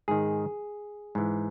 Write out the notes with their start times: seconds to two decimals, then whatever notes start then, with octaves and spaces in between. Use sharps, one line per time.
0.08 G#2 D#3 G#4
1.15 G#2 E3